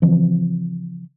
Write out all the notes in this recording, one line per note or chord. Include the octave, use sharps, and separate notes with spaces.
C#3 E3 F3 C4